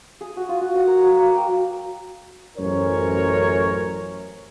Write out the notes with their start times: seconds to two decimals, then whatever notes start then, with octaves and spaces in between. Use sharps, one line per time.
0.21 G#4
0.37 F#4
0.49 F4
0.61 F#4
0.75 F#5
0.87 A#4
1.03 F#3
1.17 A#3
1.35 G5
2.58 A1 F#2 C#4 A#4 C5 C#5